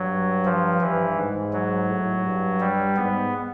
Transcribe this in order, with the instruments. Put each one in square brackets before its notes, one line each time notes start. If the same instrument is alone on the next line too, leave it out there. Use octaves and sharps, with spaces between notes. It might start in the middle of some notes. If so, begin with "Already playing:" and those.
Already playing: [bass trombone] G2 [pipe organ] F#3
[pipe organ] F3
[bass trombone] G2 [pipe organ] E3
[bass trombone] G#2
[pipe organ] F#3
[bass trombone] A2
G2
[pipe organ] G3
[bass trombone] G#2 [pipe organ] B3